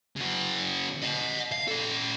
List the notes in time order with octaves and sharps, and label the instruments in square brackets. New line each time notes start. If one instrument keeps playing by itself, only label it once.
[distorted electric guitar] C#3 F#4
D#5 F#5
F5
C#4 A4